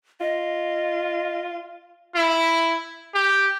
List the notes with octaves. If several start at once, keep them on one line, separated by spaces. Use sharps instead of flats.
F4 D#5
E4
G4